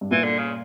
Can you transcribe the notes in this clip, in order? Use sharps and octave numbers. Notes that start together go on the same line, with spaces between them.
G2
A#2 E3
D3
C#3